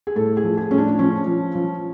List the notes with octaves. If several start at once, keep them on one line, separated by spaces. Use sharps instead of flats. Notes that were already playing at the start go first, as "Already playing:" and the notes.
G#4
A2 A4
G#4
F3
G#4
A2 C#4
D4
F3 C#4
F3
F3